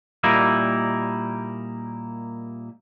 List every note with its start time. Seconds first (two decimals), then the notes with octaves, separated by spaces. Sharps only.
0.24 A#2 G3 A#3 D#4 E4